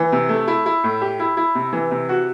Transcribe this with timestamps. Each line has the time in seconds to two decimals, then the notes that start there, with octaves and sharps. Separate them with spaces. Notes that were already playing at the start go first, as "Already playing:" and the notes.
Already playing: E3
0.12 C3
0.29 A3
0.48 E4
0.66 E4
0.84 A2
1.01 G4
1.20 E4
1.37 E4
1.55 C3
1.73 E3
1.91 C3
2.09 F#4